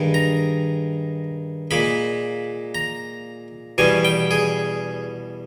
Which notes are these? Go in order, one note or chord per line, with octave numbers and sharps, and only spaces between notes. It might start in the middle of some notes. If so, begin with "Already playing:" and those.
Already playing: G2 D#3 G#3
A#5
A#2 G#3 B5
A#5
E2 B2 G3 G#5
G5
G#4